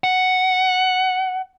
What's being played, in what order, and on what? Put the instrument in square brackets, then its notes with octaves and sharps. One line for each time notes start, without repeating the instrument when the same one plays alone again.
[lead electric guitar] F#5